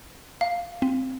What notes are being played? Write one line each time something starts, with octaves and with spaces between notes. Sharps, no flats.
F5
C4